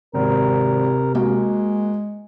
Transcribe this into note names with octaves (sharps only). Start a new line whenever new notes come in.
G#1 C3 A#4
G#3 A#3 F#4